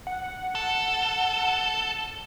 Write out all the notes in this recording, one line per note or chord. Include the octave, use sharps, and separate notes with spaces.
F#5
A4